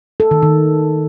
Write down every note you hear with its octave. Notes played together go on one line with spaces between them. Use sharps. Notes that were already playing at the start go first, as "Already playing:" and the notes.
A4
D#3
D#3